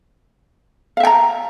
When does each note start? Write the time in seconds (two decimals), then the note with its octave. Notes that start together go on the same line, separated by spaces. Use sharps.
0.97 F5
1.00 E5
1.03 G5
1.07 A#5